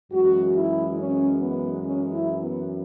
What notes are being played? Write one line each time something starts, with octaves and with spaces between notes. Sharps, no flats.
F#2 E3 G#3 F#4
E4
C#4
B3
C#4
E4
B3